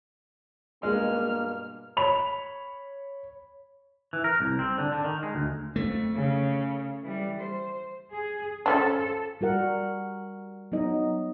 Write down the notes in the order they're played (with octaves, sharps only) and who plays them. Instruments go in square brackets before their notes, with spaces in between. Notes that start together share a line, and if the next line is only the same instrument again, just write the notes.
[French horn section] G2 B2 A#3 [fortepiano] G#3 [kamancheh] F6
[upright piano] C#5 B5 F7
[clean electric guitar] E3
A#4
C2
C4
D3
D3
D#3
G#3
D2
[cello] F2 [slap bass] A3
[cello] C#3
E3 G3
C5
[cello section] G#4
[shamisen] F3 C#4 D4 [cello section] A4
[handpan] G3 F#4 A#4 F#5
F#3 B3 D#4 D#5